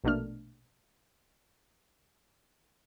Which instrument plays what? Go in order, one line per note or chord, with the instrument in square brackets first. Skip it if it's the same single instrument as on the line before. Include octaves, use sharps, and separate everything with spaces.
[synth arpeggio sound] A#1 B2 A3 A#3 D4 F6